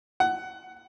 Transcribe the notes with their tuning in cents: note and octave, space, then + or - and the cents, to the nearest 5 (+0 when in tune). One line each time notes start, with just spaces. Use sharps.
F#5 +15